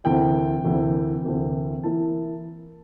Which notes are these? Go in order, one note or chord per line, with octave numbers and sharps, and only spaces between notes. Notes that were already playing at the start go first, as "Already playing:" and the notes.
D2 C3 E3 A#3 E4 G5
D2 C3 E3 A#3 E4
D2 C3 E3 A#3 E4
E3 A#3 E4 A5